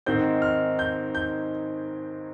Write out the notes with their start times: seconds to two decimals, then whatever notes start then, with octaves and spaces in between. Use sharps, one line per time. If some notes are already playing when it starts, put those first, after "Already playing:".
0.06 G#2 D#3 G#3 C4 G6
0.42 F6
0.79 G6
1.15 G6